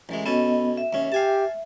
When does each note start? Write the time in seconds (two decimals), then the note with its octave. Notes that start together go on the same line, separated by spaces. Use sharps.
0.09 A1 E3 G#3
0.26 B2 B3 C#4 A4 D#5
0.77 E5
0.93 D#2 C#4
1.12 G4 F5 G#5 A5